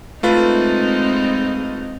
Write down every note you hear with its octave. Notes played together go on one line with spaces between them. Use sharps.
G#3 A3 C4 D#4 F4 B4